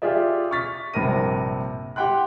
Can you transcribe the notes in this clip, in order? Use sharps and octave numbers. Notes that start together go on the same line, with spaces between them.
F4 G4 G#4 D5 E5
C#6 F6 A6 B6
A#1 G2 C3 A#4 A#6 D#7
G4 F#5 G5 C6 F#6